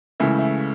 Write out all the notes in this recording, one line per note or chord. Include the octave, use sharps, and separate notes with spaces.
C#2 C#3 E3 A3 E5
E5